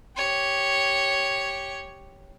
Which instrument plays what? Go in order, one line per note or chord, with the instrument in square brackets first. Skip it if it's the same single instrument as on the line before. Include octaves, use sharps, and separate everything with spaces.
[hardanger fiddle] G4 C#5